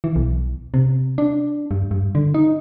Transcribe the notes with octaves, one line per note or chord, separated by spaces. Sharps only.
E3
B1
C3
D4
G2
G2
D3
D#4